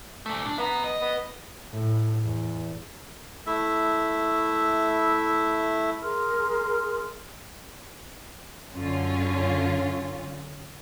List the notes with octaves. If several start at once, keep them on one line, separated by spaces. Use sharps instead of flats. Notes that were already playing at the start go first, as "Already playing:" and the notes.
A#2 A3
D4
B3 E5 A#5
D#5
B3
A2
E2
A3 E4 E5
G#4 A#4 C6 F6
F#2 D3 C#4 F4